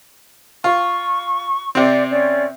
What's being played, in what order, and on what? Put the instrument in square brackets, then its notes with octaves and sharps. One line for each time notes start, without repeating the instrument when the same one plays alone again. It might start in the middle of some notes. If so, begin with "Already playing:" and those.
[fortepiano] F4 [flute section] C#6
[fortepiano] C3 C4 [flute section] D5 D6
[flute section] C#4 D5